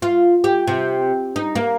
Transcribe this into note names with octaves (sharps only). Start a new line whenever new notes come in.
F4
G4
C3
D#4
A#3